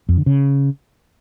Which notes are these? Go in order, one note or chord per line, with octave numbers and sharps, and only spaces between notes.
F2
D3
C#3